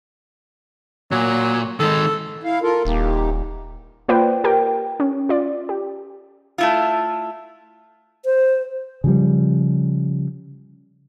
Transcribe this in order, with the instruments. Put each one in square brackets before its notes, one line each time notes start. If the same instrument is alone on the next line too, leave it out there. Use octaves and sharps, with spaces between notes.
[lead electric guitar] A#2 [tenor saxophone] F#3
[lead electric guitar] D#3 G#3 [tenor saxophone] A4
[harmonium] E4 F5
F4 A4 A#4
[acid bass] D#1 [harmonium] A#3 D#4 G4
[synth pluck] A#3 F4 B4 C5 D5 G5
G4 A#4 G5
C#4
F4 D5
G4
[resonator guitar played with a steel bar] A3 E4 F4
[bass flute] C5
[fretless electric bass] C#3 F3 G3